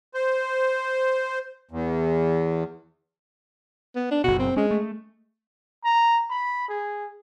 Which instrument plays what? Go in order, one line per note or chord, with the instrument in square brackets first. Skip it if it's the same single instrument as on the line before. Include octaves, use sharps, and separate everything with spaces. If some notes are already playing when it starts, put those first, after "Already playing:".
[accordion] C5
E2
[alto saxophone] B3
D4
[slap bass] F#1 B2 [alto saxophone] F#4
[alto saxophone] C4
[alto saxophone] G#3 [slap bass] C#4
[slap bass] A3
[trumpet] A#5
B5
G#4